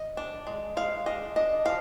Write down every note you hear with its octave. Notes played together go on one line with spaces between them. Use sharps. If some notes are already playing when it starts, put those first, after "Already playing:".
Already playing: D#5
D4
G#3
G#3 F5
D4 D#5
D4 D#5
F3 F5